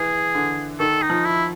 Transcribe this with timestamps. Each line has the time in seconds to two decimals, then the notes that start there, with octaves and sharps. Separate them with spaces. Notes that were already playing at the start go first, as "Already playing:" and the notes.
Already playing: E3 G#4
0.35 D3
0.80 D#3 A4
1.02 D#4
1.10 F3
1.25 E4